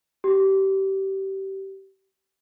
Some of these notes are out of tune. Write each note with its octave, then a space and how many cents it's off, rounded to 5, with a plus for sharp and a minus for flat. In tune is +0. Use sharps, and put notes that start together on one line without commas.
G4 -25